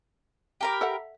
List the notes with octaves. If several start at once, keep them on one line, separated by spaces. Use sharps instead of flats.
G4 A#4 B5
A4 E5 F#5